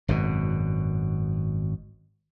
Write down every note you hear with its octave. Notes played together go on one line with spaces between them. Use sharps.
G#1 F#2 B2